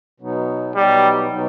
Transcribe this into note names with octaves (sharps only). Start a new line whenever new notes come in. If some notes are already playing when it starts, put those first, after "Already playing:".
B2 F#3 B3 D#4
B2 F#3 G3 B3 D#4
B2 F#3 B3 D#4